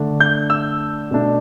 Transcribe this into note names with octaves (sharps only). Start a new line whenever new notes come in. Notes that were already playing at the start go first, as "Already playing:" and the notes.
Already playing: D3 A3 D4
G6
E6
B2 A3 D4